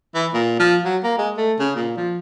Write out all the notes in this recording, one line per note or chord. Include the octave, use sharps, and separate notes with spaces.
E3
A#2
F3
F#3
A#3
G#3
A3
C#3
A#2
F3